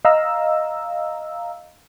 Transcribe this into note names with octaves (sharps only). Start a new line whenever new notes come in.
D#5 F5 A#5 E6